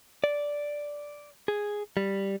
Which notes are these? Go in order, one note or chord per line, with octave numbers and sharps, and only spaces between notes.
D5
G#4
G3